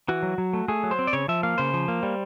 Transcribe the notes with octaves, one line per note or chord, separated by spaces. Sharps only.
E3 F#4
F#3
F#3
A3
A3 G#4
F#3
C5
C4
D5
C#3 C#5
F3 E5
A#3 F5
C#3 C5
F3
A#3
G3